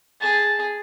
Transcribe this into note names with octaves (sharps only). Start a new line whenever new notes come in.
G#4 A5